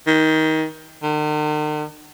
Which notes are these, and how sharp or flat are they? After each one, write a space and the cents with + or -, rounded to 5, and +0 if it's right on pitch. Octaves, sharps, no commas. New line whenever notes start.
D#3 +20
D#3 -45